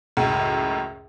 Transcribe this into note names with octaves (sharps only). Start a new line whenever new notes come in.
C#2 F#2 A2